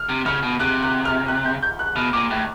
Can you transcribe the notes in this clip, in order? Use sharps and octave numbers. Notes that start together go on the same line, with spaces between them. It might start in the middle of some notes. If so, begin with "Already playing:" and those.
Already playing: F6
C3
C#3 F6
B2
C3 F#6
F#6
F6
F#6
G6
G6
F#6
B2 F6
A#2 D6
A2 F#6